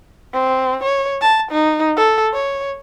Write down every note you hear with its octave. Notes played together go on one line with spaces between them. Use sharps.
C4
C#5
A5
D#4
A4
C#5